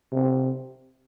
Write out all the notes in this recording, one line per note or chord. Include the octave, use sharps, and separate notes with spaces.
C3